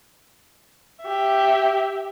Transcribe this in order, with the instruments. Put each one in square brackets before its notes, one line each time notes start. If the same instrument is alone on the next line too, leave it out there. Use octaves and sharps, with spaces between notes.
[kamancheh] G4 E5